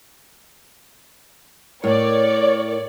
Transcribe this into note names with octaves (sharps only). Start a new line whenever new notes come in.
A2 A#4 C#5 D5